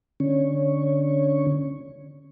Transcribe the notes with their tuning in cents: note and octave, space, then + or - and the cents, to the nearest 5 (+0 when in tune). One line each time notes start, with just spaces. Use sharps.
D3 +0 C#4 -10 C#5 +0